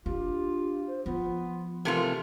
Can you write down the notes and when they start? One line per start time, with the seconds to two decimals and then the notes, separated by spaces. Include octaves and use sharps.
0.06 D4 F4 G4
0.87 C5
1.06 F3 B3 F4
1.85 C3 E3 A3 F4 A#4